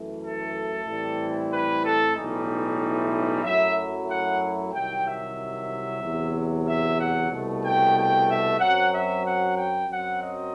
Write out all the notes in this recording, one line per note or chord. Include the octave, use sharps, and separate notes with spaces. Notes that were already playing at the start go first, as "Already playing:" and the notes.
Already playing: F#2 E3 A3
A4
A2 E3 G3 C4 E4
B4
A4
B1 A2 E3 G3 D#4
F#2 F#3 A3 E4 E5
F#5
C2 C3 D#3 F#3 G5
E5
E2 C3 F#3
E5
F#5
C2 B2 A3
G5
G5
E5
F#2 F#3 C4 F#5
E5
F#5
G5
F#2 F#3 C4 F#5
D#5